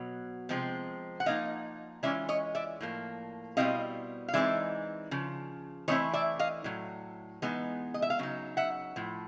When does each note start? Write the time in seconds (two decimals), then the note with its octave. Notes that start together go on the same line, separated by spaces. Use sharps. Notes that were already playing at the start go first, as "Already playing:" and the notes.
Already playing: B2 F#3
0.49 C3 F3 G#3 C4
1.20 F#5
1.26 F3 A#3 D#4 D#5 F5
2.03 E3 G#3 C#4 F4 D5 E5
2.29 C#5 D#5
2.55 D5 E5
2.81 A2 F3 A#3
3.57 B2 G3 C4 E4 D#5 F5
4.28 F5
4.34 E3 G#3 C4 D#4 D5 E5
5.11 C#3 F3
5.88 E3 A3 C4 E4 C#5 D#5
6.13 D5 E5
6.39 D#5 F5
6.64 A2 F#3
7.42 E3 G#3 B3 D#4
7.94 D#5
8.02 E5
8.10 F5
8.19 C#3 F#3 D#4
8.57 E5 F#5
8.96 A2 F3